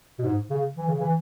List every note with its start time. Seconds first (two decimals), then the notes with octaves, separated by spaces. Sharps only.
0.19 B2
0.24 G#2
0.50 C#3
0.77 E3
0.88 C#3
1.00 E3